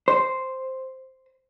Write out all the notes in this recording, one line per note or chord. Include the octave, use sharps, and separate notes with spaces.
C5